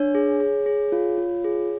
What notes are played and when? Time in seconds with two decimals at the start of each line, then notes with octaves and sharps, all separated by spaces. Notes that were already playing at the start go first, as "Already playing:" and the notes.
Already playing: D4 C#5
0.15 G#4
0.40 G#4
0.66 G#4
0.92 F4
1.18 F4
1.44 G#4